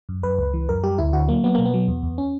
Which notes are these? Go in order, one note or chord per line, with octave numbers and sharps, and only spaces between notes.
F#2
F#2 B4
C#2
E3
F#2 A#4
G3 G4
D2 E4
D3 F#4
F#3 A#3
F#3 B3
B2 A#3
B3
F#3
E2
E2
C#4